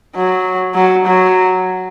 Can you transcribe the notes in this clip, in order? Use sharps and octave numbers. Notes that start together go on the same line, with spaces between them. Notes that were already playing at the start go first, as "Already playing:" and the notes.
F#3
F#3
F#3